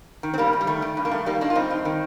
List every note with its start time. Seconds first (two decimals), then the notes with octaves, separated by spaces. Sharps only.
0.23 D#3
0.34 C4
0.38 G2 G3 A#3
0.53 G2
0.61 G3
0.67 D#3 A3
0.82 D#3
0.97 G2
1.05 A#3
1.11 G2 A3
1.26 D#3 G3 A#3
1.41 D#3 A#3 D4
1.50 F4
1.55 G2 C4 D#4
1.71 G2
1.85 D#3